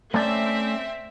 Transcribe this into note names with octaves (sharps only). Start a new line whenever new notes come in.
A3 C4 C#4 D5 E5